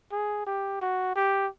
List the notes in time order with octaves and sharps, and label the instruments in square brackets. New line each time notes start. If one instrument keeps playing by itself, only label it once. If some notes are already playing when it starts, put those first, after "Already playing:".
[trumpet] G#4
G4
F#4
G4